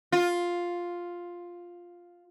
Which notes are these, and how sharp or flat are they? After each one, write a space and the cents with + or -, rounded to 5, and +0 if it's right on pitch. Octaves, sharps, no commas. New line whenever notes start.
F4 +5